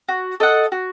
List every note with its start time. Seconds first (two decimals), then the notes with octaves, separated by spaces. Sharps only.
0.08 F#4
0.40 A4 D#5 F#5
0.72 F#4